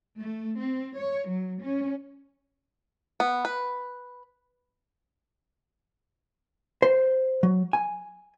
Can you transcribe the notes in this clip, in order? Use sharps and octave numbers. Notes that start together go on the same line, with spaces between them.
A3
C4
C#5
F#3
C#4
B3
B4
C5
F#3
G#5